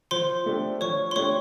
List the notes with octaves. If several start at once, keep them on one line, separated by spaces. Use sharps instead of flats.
F3 C5 C6
A3 D4 G4
F3 C#5 C#6
C6
A3 D4 G4 C#5 C#6